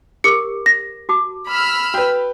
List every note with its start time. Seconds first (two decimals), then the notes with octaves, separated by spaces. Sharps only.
0.24 G4 A#4 D6 C#7
0.66 A#6
1.09 F#4 A5 D6
1.49 B5 E6 F6
1.94 F#4 B4 G5